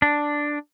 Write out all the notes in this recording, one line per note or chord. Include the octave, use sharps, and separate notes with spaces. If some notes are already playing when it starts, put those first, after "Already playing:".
D4